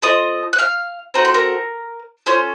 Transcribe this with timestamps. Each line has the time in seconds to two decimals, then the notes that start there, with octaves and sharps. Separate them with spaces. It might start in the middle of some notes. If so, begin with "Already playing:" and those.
0.02 C4 F4 A4 D#5 D#6
0.53 F#6
0.59 F5 F6
1.14 C4 D#4 F#4 A4 A#5
1.25 C6
1.34 A#4 A#5
2.26 C#4 F4 A4 C5 C6